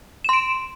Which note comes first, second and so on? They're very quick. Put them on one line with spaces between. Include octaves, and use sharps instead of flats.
E7 C6 D7